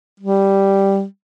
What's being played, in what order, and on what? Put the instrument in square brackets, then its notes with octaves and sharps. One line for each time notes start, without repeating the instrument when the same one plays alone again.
[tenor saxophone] G3